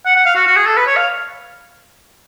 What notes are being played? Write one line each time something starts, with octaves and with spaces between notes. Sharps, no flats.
F#5
F#5
F5
F#4
F#4
G#4
A4
B4
C#5
F5